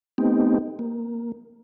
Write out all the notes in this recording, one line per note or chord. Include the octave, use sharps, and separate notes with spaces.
A3 B3 C4 D#4 G4
A#3